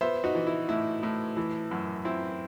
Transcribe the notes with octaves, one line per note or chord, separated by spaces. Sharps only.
B3 C5 E5
D#4 F#4
E3
E4
A2 E4
A2
E3
F#2
C4 E4